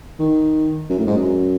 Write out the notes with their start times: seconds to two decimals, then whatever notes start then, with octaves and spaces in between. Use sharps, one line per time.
0.19 D#3
0.89 F#2
0.99 A2
1.07 G#2
1.16 F#2